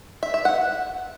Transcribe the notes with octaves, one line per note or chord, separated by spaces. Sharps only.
E5
E5
F#5